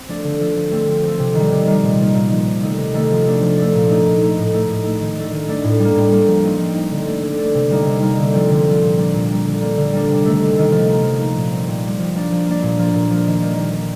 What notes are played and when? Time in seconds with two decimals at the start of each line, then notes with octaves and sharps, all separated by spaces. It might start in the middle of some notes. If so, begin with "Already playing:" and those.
Already playing: C4
0.08 F3 A3 D4
0.23 D3
0.39 F3 A3 D4
0.55 F3
0.71 A3 C4
0.88 F3
1.03 A3 C4
1.19 C3
1.35 D#3 G3
1.52 C3
1.67 D#3 G3
1.82 A#2
1.99 F3 A#3 D#4
2.14 A#2
2.30 F3 A#3 D#4
2.46 C3
2.62 D#3 A3 D#4
2.78 C3
2.94 D#3 A3 D#4
3.10 F3
3.26 A3 D4
3.42 F3
3.58 A3 D4
3.74 A#2
3.89 A3 D#4
4.05 A#2
4.21 A3 D#4
4.37 A2
4.53 A3 D#4
4.68 A2
4.85 A3 D#4
5.00 D#3
5.16 A3 D4
5.32 D#3
5.48 A3 D4
5.64 A2
5.79 G3
5.84 A#3
5.96 A2
6.12 G3 A#3
6.27 F3
6.43 C4 D#4
6.60 F3
6.75 C4 D#4
6.91 D3
7.07 A3 D4
7.22 D3
7.38 A3 D4
7.54 C3
7.70 G3 A#3 D#4
7.86 C3
8.02 G3 A#3 D#4
8.18 D3
8.34 F3 C4
8.50 D3
8.66 F3 C4
8.81 A#2
8.97 G3 A#3 D4
9.14 A#2
9.30 G3 A#3 D4
9.45 D3
9.61 G3 A#3 D4
9.77 D3
9.92 G3 A#3 D4
10.08 C3
10.24 D#3 A3
10.41 C3
10.56 D#3 A3
10.72 F3
10.88 A#3 D#4
11.03 F3
11.19 A#3 D#4
11.35 A#2
11.51 G3 C4
11.67 A#2
11.83 G3 C4
11.99 F3
12.15 A#3 D4
12.31 F3
12.46 A#3 D4
12.62 A#2
12.79 F3 A#3
12.95 A#2
13.10 F3 A#3
13.27 D#3
13.42 G3 A#3
13.58 D#3
13.74 G3 A#3